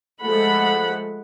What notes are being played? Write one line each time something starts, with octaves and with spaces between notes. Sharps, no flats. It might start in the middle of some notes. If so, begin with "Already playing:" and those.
F3 G#3 A3 A4 F#5 B5